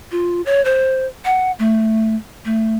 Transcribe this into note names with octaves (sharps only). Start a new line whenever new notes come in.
F4
C#5
C5
F#5
A3
A3